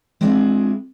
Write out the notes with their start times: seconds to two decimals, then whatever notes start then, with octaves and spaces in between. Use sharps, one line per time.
0.21 G#3 C4 D4 E4 F4 G#4